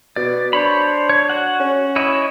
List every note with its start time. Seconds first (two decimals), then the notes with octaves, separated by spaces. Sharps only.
0.16 B2 D5
0.53 D4 C5 C#5 B5
1.09 C#5
1.30 F#4 F#5
1.60 C#4
1.96 E4 C#5 D#5